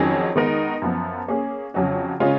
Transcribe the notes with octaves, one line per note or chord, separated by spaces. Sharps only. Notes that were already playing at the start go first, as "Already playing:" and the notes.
Already playing: F2 D#3 F#3 C#4 G#4
D#3 G#3 B3 D#4 A#4
F#2 F3 B3
A#3 C#4 G#4
F2 C#3 F#3 C#4 F#4
C#3 G#3 C#4 F4